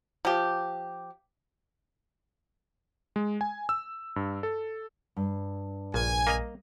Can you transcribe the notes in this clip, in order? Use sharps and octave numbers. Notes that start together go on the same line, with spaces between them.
F3 G4
G#3
G#5
E6
G2
A4
G2
A#1 A#2 G#5
A#3 D#5 A#5